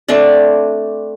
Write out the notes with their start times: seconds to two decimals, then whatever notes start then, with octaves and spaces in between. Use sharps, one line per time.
0.08 A3 C4 D4 D5